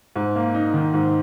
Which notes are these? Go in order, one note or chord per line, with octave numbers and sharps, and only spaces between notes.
G#2
A#3
D#4
D#3
G#2